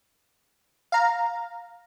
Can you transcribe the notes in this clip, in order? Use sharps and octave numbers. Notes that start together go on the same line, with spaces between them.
F5 A#5